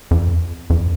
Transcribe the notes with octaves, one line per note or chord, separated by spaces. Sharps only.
F2
F2